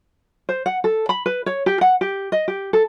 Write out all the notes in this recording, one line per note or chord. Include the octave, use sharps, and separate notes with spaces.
C5
F#5
A4
B5
B4
C#5
G4
F#5
G4
D#5
G4
A4